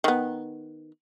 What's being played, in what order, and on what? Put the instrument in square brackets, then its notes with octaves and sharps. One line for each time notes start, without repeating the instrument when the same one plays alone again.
[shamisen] D#3 B3